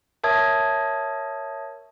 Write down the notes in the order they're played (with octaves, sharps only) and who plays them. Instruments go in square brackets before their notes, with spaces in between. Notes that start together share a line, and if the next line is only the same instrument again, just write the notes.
[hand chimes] A#4 C#5 E5 A5 D#6 G#6